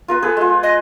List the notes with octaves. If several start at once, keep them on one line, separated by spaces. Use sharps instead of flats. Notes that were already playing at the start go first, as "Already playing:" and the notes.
F4 A#4 B4
G#4 A4 B4
G#3 F4
D#5